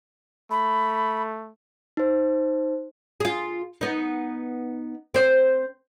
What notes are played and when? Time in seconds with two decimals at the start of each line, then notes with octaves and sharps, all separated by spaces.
0.51 A3 B5
1.97 D#4 C5
3.20 F4 G#4
3.81 B3 D#4
5.14 C4 C5